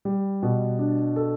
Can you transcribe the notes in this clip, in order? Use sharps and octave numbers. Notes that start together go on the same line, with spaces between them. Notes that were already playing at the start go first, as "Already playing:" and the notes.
G3
B2
D4
A4